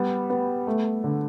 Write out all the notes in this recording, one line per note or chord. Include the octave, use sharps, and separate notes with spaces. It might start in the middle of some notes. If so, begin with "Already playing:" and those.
Already playing: G3 B3
B3
A3
D3